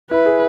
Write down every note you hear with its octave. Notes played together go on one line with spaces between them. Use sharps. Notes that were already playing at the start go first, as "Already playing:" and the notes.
E4 B4
G#4